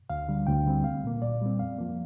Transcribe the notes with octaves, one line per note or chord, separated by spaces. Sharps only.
D2 F5
D3 G3
D2 G5
D3 G3 C4
C2 F5
A#2 A#3
A#2 D5
G3 C4
F2 F5
F3 A#3